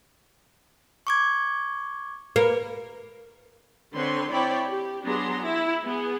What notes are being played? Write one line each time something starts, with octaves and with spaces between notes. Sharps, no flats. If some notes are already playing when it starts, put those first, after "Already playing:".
C#6 D6 G#6
A#3 B4
D3 C4 B4 C#5 C6
C4 E4 C#5 D5 G5 B5
G4
F#3 B3 D4 G#4 A#5 C6
E4
B3 G#4